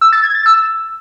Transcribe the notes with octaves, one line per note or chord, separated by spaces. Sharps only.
E6
A6
G#6
A6
E6